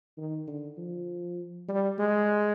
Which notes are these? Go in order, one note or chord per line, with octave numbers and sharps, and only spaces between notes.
D#3
D3
F3
G3
G#3